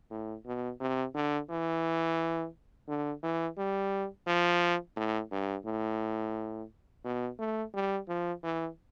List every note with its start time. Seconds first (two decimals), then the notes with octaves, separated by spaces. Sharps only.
0.11 A2
0.46 B2
0.80 C3
1.15 D3
1.50 E3
2.88 D3
3.23 E3
3.58 G3
4.27 F3
4.96 A2
5.32 G2
5.66 A2
7.05 B2
7.39 A3
7.74 G3
8.08 F3
8.43 E3